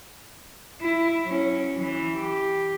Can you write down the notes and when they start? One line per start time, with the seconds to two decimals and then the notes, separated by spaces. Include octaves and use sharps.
0.81 E4
1.24 F#3 C#4
1.79 E3
2.16 G4